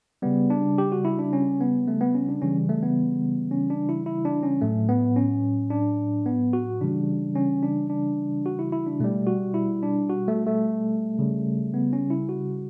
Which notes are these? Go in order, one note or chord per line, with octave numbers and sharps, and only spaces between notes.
C#3 G3 B3
D4
G4
F#4
E4
D4
C#4
B3
A3
B3
C#4
D4
C#3 E3 G3 C#4
A3
B3
C#4
D4
E4
E4
D4
C#4
A2 F#3 A3
B3
C#4
D4
B3
F#4
C#3 E3 G3 D4
C#4
D4
D4
F#4
E4
E4
D4
B2 G3 A3
F#4
E4
D4
F#4
A3
A3
C#3 G3
B3
C#4
E4
F#4